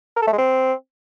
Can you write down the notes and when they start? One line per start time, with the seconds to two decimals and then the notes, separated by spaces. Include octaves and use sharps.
0.16 A#4
0.22 A4
0.27 A3
0.33 G#3
0.38 C4